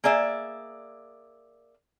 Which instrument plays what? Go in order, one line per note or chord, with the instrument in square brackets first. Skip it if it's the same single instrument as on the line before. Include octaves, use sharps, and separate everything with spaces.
[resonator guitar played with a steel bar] A#3 G#4 D5 E5